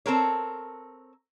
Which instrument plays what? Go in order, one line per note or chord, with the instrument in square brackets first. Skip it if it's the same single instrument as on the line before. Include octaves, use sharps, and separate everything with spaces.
[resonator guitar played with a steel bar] C4 A4 A#4 C#5